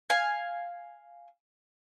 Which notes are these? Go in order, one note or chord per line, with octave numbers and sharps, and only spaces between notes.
F5 G#5